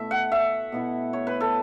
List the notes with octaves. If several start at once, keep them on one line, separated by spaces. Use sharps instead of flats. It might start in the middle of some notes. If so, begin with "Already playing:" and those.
Already playing: B2 A3 E4 E5
F#5
E5
B2 B3 E4
C#5
B4
A4